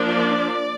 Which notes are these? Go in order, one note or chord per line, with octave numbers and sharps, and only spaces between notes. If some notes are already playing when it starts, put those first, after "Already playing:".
Already playing: F3 A#3 D4
D5